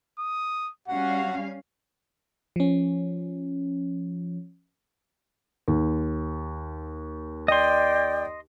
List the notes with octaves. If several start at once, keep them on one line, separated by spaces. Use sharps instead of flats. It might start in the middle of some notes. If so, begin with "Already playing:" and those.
D#6
G3 C#4 F#4 F5 F#5
F3 C#4
D#2
D5 D#5 G5 C6